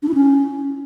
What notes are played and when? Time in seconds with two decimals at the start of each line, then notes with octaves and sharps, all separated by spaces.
0.03 D4
0.08 E4
0.14 C#4